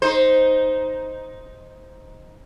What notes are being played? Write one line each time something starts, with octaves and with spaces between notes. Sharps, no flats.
D#4 C5